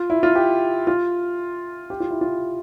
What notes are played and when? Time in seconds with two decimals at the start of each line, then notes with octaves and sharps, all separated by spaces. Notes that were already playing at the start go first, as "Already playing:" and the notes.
Already playing: F4
0.10 E4
0.23 F4
0.35 G4
0.87 F4
1.90 G4
2.00 F4
2.10 E4
2.21 F4